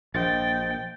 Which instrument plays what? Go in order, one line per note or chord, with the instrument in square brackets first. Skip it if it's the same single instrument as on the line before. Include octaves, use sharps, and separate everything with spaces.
[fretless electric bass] A#1 [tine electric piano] A#3 C5 D#5 [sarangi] G5 [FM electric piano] A6